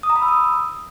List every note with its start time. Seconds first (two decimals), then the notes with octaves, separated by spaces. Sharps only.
0.03 D#6
0.10 A#5
0.16 B5
0.22 E6
0.28 D#6